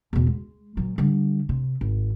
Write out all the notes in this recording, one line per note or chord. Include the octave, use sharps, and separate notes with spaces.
E2 B2
G#3
A#2 F#3
D3 G3
C3
G#1